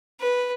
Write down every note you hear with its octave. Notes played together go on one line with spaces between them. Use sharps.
B4